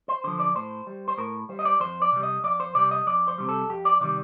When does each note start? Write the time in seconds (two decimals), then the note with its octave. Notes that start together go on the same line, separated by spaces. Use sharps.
0.08 C5
0.24 D3 F3 C5
0.40 D5
0.55 A2 C5
0.87 G3
1.08 C5
1.18 A2 A#4
1.49 G3 C5
1.59 D#5
1.65 D5
1.80 F2 C5
2.02 D5
2.12 C3 G3
2.23 D#5
2.44 F2 D5
2.60 C5
2.75 C3 G3 D5
2.91 D#5
3.07 F2 D5
3.28 C5
3.38 C3 D#3 G3
3.49 A4
3.69 F2 G4
3.85 D5
4.01 C3 D#3 G3 D5